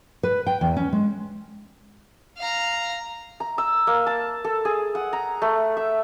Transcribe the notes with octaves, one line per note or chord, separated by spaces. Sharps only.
B4
G5
E2
C#4
G#3
F5 A#5
A#5
E6
A#3
A5
A4
G#4
F#5
A#5
A3
E5